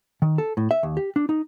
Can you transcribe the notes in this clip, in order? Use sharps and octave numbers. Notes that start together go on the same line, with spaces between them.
D#3
A4
A2
E5
D#2
G4
D4
D#4